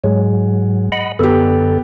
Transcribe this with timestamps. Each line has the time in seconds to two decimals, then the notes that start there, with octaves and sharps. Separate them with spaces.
0.04 G#2 F#3 G#3
0.92 D#5 F#5 B5
1.19 F#2 D3 B3 G4 A4